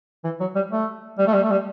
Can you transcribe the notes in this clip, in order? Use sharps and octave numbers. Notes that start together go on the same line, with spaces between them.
E3
F#3
G3
A3
G3
A3
G3
A3
G3